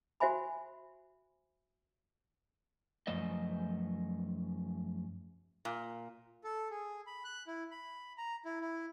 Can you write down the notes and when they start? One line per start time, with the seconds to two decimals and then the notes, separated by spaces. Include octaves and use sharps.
0.20 F#4 C5 E5 G#5 B5
3.07 F#2 F3 A3 C5 D#5
5.65 A#2
6.44 A4
6.70 G#4
7.07 B5
7.24 F#6
7.47 E4
7.71 B5
8.18 A#5
8.45 E4
8.61 E4